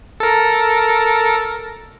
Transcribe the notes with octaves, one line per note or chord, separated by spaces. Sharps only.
A4 A#4